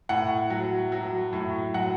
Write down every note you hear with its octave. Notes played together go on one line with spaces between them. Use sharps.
A2 F#5
F#3
F#3
A2
F#3 F#5